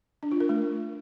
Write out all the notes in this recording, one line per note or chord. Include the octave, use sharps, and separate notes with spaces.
D4
F4
A#4
A3